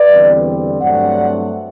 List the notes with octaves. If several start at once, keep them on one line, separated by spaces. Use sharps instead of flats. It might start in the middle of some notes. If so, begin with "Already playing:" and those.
Already playing: B4 D5
E2 D3 G3 C4
G2 F#3 A3 C4 D5 F#5